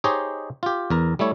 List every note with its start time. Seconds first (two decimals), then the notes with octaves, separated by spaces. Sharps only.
0.04 D#4 G4 G#4 C5 C#5 D#5
0.63 F4 G4
0.90 E2 A#4 A#5
1.19 G3 A3 E4 C#5